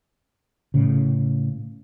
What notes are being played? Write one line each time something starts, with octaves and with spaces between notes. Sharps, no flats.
A2 C#3